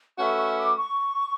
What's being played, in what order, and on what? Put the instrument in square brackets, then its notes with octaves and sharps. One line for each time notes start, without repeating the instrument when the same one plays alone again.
[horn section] A3 C#4 F#4 B4 E5 [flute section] C#6
[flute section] C#6
D6
C#6